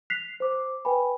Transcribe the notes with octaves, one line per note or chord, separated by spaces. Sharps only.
F#6 B6 C7 F7
C5 D6
B4 G5 G#5 B5